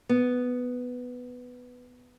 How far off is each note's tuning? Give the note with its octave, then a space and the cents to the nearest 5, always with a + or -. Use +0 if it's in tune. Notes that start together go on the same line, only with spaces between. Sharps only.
B3 +5